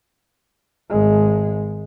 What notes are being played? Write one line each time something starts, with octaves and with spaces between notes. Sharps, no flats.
G#1 G#3